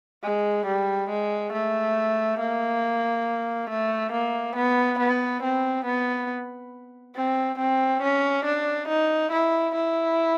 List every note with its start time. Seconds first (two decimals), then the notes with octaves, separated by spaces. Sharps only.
0.23 G#3
0.66 G3
1.10 G#3
1.53 A3
2.39 A#3
3.70 A3
4.12 A#3
4.56 B3
4.99 B3
5.43 C4
5.85 B3
7.16 C4
7.59 C4
8.02 C#4
8.45 D4
8.89 D#4
9.32 E4
9.75 E4